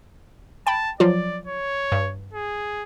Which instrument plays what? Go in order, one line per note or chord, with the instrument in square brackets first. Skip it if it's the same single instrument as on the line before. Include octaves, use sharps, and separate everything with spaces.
[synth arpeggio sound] G5 B5 [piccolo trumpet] A5
[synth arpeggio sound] F3 F#3 F4 [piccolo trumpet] D5
[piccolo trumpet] C#5
[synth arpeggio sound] G2
[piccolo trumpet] G#4